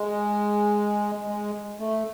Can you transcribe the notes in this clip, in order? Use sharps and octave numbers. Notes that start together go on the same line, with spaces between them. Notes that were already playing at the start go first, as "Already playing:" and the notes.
Already playing: G#3
G#3
A3